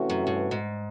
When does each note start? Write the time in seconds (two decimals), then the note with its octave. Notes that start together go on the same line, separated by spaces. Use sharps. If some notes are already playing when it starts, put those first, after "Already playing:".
Already playing: C3 E3 A3 C#4 F#4
0.09 F#2
0.27 G2
0.51 G#2